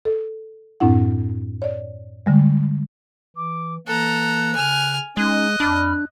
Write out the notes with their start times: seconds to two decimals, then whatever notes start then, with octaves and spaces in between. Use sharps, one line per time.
0.05 A4
0.80 F#2 A2 C4 D4 E4 F#5
1.62 C#5 D5
2.26 D3 G3 G#3
3.36 E3 D6
3.87 E3 A#3 A4 A#5 F#6
4.55 C#3 G#5 F6
5.17 G#3 C#4 D#4 D#5 F#6
5.60 F2 D4 B5 F6